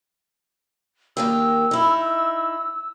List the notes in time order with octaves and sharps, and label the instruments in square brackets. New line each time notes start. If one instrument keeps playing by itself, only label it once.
[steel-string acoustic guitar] D#3 A#3 G4 [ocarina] E6
[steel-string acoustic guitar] D#4 E4